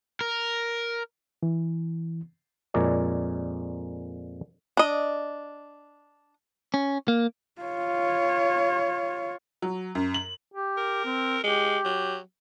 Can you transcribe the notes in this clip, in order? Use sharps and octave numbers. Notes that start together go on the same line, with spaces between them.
A#4
E3
F2 A#2 G#3 A#4 C#5 D5
D4 D#5
C#4
A#3
F4 C#5
F#3
F#2
F#7
G4
A#4
C4
G#3 G4
F#3